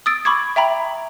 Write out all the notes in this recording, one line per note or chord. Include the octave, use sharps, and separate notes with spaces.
D#6 E6 A6 D7
B5 C#6 D6 G#6
E5 G5 A#5 B5